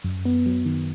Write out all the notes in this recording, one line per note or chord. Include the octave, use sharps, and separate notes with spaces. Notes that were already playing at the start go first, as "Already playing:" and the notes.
F#2
B3
F#3
D#3